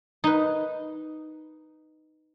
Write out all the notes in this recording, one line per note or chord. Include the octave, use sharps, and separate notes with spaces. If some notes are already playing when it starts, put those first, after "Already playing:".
D#4 B4